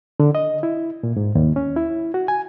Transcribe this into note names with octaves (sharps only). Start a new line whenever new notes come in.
D3
D#5
E4
A#2
G#2
D#2
C#4
E4
F#4
G#5